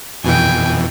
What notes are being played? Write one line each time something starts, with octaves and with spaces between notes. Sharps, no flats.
F2 B2 E3 G5 G#5